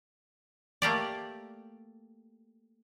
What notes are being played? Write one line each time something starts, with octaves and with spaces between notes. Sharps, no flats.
A3 A#3 G4 D5